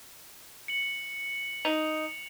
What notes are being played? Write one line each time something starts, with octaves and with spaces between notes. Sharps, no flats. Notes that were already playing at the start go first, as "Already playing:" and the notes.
C#7 F#7
D#4 F7